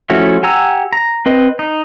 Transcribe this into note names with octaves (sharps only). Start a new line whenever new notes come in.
F3 A3 C#4 E4 F#4
G4 F#5 G#5 A#5 E6
A#5
C4 B4 D#5
D#4